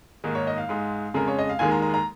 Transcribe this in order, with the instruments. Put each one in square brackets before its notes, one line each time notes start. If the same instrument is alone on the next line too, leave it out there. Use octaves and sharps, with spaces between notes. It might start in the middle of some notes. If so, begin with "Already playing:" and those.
[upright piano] G#2 D#3 A#3 G#4
C#5
D#5
F5
G#2 G#3
F2 C#3 G#3 A#4
C#5
D#5
F5
D#2 D#3 G#3 G#5
A#5
A#5
A#5